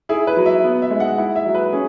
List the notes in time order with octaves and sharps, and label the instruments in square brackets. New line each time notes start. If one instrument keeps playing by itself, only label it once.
[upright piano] E4 G#4
B4
F#3
E5
B3
E5
G#3
F#5
E4 F#5
E5
F#3
B4
C#4 G#4